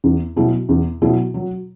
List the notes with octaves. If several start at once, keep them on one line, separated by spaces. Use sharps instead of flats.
E2
B2 F#3 E4 G#4
E2
B2 F#3 E4 G#4
F#3